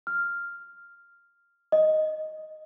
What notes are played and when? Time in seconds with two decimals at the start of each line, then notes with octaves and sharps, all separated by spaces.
0.07 F6
1.72 D#5